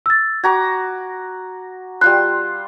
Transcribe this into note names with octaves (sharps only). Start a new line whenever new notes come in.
E6 A6
F#4 A#5 D6 G#6
G3 F4 C6 F#6